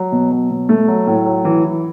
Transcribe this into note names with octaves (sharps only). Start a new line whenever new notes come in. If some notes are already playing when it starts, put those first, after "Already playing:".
Already playing: F#3
B2
F#3
B2
A3
F#3
A2
F#3
E3
E3